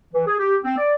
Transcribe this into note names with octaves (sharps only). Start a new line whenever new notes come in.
E3
G#4
G4
C4
D5